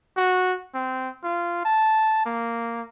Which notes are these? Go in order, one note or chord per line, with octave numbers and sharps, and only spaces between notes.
F#4
C4
F4
A5
A#3